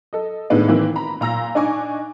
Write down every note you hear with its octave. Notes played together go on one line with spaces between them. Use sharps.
A4 D#5
A2 D#3 G#3 B3 D4
D#3 E3 A#3 C4 E4
A#5 B5
A#2 A#5 E6 A#6
D4 D#4 G#5 C#6 D6